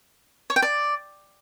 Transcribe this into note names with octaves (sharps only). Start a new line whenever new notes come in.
C#5
G5
D5